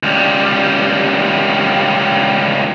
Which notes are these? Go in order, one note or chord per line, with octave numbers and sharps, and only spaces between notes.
C#2 G3